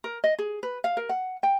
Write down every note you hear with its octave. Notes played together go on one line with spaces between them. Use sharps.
A#4
D#5
G#4
B4
F5
A#4
F#5
G5